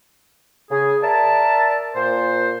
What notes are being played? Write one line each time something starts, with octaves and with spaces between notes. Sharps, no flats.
C#3 G#4
A#4 D5 E5 A5
A#2 C5